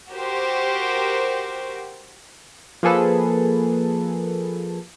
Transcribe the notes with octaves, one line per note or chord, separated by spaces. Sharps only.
F#4 G4 A#4 C5
F3 A#3 G#4 A4 B4